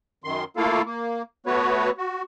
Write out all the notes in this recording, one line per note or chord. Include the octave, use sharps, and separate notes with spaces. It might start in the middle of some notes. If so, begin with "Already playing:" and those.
F#2 D#3 C6
A3 A#3 E4 F4 A4 F5
A#3
A3 B3 F#4 B4 C#5
F#4